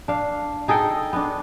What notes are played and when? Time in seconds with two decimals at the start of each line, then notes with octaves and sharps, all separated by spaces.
0.08 D4 F5
0.68 D#4 G#4 A4 G5
1.13 B3 D4